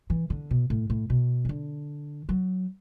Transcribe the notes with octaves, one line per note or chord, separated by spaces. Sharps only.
E3
D3
B2
A2
A2
B2
E3
D3
F#3